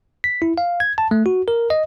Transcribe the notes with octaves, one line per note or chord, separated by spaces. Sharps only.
B6
E4
F5
G#6
A5
A3
F#4
A#4
D#5